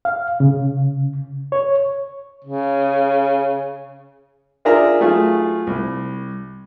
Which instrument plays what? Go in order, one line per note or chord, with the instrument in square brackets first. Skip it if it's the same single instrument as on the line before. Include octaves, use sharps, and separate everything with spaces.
[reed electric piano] F5
C#3
C#5
[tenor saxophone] C#3
[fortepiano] D4 F4 G#4 A#4 E5 A#5
F#3 A3 F4 G#4
C2